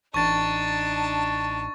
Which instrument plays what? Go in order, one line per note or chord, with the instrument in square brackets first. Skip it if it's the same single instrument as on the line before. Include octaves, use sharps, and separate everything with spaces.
[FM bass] A1 [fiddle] D4 D#4 [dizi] A5 [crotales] C#6 A6